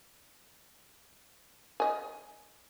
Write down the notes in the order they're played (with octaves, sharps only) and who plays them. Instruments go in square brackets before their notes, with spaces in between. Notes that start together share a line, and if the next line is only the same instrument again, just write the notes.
[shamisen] D#5 G#5